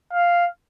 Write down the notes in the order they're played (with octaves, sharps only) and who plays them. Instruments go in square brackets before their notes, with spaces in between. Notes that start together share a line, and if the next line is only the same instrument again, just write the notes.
[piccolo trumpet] F5